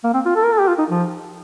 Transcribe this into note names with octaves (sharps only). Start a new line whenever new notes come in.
A#3
C4
F4
A4
A#4
A4
G4
F4
D#4
F3